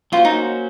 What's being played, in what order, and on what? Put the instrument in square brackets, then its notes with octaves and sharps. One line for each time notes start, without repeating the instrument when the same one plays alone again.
[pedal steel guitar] F#3 A#3 C#4 F#4 C5 [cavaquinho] F4
[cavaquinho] D#4